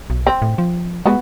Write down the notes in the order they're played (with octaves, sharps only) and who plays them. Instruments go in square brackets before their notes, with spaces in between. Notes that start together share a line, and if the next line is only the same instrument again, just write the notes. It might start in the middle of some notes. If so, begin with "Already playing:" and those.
[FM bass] B1
[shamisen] C4
[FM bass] A2
F3
[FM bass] G#3 [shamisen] B3 F#4